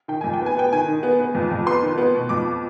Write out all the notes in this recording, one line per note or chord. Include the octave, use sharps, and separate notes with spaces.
D#3 G5
F2 G#5
G5
B3
G#5
B3 G5
D#3 G#5
D#3
B3
B3
F2
F2
B3 C6
D#3
B3
B2
F2 D6